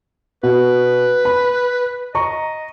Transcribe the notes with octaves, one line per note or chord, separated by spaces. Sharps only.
B2 B4
B5
D#5 A#5 C#6